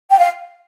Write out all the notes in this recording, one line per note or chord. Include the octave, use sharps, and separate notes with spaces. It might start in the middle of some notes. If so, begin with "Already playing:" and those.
G5
F5